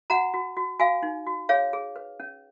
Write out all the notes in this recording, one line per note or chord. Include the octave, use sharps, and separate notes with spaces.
F#4 F#5 A#5
F#4
F#4
F#4 F5 G#5
D#4
F#4
G#4 C#5 F5
G#4
B4
C#4